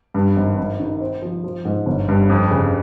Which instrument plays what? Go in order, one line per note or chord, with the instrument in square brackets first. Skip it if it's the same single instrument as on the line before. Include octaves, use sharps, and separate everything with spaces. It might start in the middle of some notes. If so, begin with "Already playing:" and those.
[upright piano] G2
G#1
G#1
D#3
C4
F3
F3
G#2
G1
G2
F2
C#3